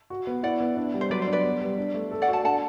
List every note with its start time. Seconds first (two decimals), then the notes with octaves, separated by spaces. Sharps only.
0.10 F#4
0.27 B3
0.43 E4 D5 F#5
0.60 B3
0.77 D4
0.94 G3
1.01 C5
1.10 F#3 B4 D5
1.22 C5
1.27 D4
1.32 B4 D5
1.44 B3
1.61 G3
1.78 D4
1.94 A3
2.11 A4
2.22 D5 F#5
2.28 F#4
2.33 F#5 A5
2.45 D4 F#5 A5